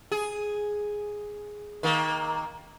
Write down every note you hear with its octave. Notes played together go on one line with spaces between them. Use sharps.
G#4
D#3 A#3